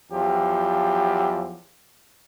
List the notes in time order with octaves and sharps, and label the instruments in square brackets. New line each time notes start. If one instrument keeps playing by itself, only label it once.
[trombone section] E2 F3 F#3 G4